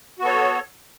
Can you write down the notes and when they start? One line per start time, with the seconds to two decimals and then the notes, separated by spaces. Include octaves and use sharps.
0.19 F#4
0.22 B3
0.24 A4
0.27 C#5